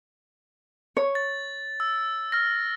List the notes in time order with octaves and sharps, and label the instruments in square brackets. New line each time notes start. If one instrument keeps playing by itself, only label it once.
[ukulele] C#5
[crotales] A6
E6
F6 A#6